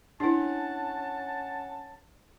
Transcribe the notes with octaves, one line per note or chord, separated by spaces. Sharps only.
C#4 D4 E4 F#5 A5